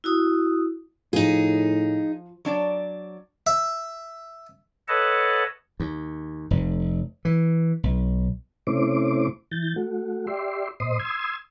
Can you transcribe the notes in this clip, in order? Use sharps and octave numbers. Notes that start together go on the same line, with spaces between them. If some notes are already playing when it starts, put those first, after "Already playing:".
E4 F#4 D#6
A2 F3 D#4 G#4
F#3 D4 D5
E5
A4 B4 C#5 D#5 F#5 A5
D#2
F1
E3
B1
C3 A3 C#4 E4 C5 D6
E3 G6 A6
A3 F#4
G4 D5 E5 C6
A#2 C5 D#5 C6 D#6
C6 D#6 E6 G#6